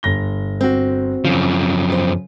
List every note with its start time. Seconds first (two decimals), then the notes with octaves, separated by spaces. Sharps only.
0.03 G1 A#6 G7
0.61 C4 F#4
1.25 F#2 C#3 F3
1.92 C5